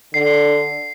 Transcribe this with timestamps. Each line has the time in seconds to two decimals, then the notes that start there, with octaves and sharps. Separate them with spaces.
0.14 D3 C7